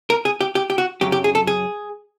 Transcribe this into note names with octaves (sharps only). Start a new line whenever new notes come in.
A#4
G#4
G4
G4
G4
F#4
F#2 C#3 F#3 G4
G4
G#4
A4
G#4